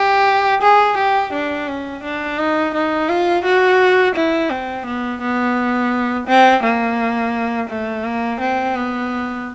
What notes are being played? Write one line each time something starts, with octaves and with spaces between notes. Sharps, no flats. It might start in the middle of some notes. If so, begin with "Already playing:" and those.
Already playing: G4
G#4
G4
D4
C#4
D4
D#4
D#4
F4
F#4
E4
C4
B3
B3
C4
A#3
A3
A#3
C4
B3